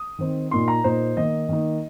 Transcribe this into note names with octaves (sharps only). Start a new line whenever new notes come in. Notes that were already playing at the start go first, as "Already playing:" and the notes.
Already playing: D#6
D#3 C4 D#4
A#2 A#3 D#4 C6
A#5
A#2 A#3 D#4 C5
D#3 A#3 D#4 D#5
D#3 A#3 D#4